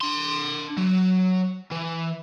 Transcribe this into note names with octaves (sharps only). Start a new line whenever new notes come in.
D4 C6
F#3
E3